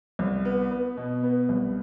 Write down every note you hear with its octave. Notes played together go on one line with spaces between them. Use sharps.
C2
B3
B3
B2
B3
C2